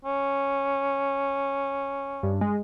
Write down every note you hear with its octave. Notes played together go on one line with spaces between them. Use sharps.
C#4
G2
G#3